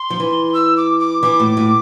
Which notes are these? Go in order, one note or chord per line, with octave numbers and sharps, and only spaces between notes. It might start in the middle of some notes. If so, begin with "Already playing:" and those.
Already playing: C6
F3
E3
E6
D6
D6
E3 D6
A2
A2